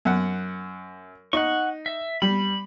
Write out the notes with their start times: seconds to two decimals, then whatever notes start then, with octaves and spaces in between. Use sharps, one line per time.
0.05 F#2 F#5
1.33 D#4 F#5 C#6
1.86 E5
2.22 G3 B5